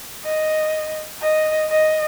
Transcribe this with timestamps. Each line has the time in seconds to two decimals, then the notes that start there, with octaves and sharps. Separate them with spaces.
0.24 D#5
1.22 D#5
1.71 D#5